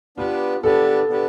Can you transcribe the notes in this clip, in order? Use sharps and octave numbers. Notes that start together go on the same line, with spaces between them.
B3 D4 F4 G4 B4
B3 D4 G4 A4 B4
B3 D4 G4 B4